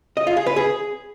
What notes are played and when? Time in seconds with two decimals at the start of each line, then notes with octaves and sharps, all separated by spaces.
0.17 D#5
0.27 F4
0.37 G#4
0.46 B4
0.56 G#4